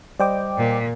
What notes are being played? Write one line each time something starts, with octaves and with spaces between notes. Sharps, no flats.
G3 C5 D5 D#5 G5 D6
A#2